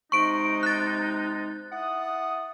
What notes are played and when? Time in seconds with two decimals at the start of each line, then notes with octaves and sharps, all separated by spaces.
0.12 C3 G#3 D#4 C#6 D7
0.63 F#6 A6
1.72 E4 F#5 D#6